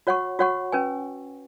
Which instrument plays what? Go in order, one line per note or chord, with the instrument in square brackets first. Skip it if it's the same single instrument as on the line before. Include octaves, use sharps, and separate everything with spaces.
[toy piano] F#4 C#5 F#5 C#6
F#4 C#5 F#5 C#6
C#4 B4 G#5